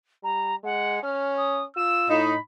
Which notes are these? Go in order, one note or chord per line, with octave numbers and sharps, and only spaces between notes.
G3 A#5
G#3 F#5
C#4 F6
D#6
F4 E6 E7
A2 D#4 B5